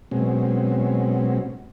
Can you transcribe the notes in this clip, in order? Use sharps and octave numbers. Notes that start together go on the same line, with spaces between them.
B2 F#3 G#3 C4 C#4